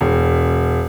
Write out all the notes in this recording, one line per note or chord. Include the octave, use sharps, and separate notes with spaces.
E1